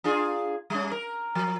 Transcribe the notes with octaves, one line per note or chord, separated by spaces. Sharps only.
D4 F4 G#4
G3 C#4
A#4
F3